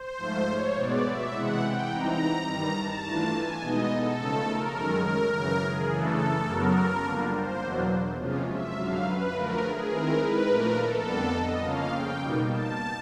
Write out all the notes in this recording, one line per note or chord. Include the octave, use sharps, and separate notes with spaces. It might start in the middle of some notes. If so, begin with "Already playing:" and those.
Already playing: C5
G#2 F3 A3
C#5
B2 G#3 B3 D5
E5
C3 E3 G#3 F#5
G5
E3 G3 C4 D#4 A#5
G2 D#3 G3 A#5
A5
E3 A3 D4 F4
G#5
B2 G#3 B3 D#4 D#5
A4
C#3 F3 A3
A#4
F#2 D#3 G#3 C#4
A#4
F#2 C#3 E3 A#4
G#4
C#3 E3 A3 D4 A4
F#2 C#3 F#3 B3 A#4
D3 G3 A#3 D4 F4
C5
E2 B2 F#3 A#3 D4
C3 F3 G#3 C#4 F4
E5
F#2 D3 F#3 F5
B4
D3 F3 A3 A#4
G#4
D#3 G#3 C4 E4 A#4
B4
A#2 F3 A3 D4 A#4
A4
F2 D3 G3 B3 D4
D#5
C#3 F3 A#3 C#4 F5
G5
B2 G3 A#3 D#4
A5